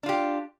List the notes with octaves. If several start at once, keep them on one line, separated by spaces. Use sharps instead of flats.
D4 F4 G4